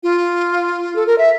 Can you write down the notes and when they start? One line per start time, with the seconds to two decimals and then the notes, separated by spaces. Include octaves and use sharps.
0.03 F4
0.96 A4
1.07 A#4
1.18 E5